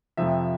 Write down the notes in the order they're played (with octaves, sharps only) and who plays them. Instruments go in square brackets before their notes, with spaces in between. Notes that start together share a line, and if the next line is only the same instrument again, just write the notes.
[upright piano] F2 C3 F3 E5